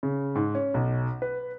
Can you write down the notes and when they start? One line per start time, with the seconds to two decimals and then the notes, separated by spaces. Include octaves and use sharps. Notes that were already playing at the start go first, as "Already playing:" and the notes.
0.03 C#3
0.35 G#2
0.55 C#4
0.74 B1
1.22 B4